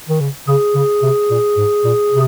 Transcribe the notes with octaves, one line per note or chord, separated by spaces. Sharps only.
D#3
C#3
C#3 G#4
C#3
C3
A#2
G#2
A#2
C3